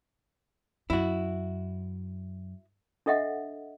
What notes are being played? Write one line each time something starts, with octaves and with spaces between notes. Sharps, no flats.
F#2 E4 F#4
D4 A4 D#5 E5 F#5